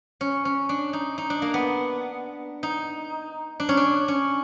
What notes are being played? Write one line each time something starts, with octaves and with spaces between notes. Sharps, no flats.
C#4
C#4
D4
D#4
D#4
D4
A#3
B3
D#4
D4
C#4
D4
C#4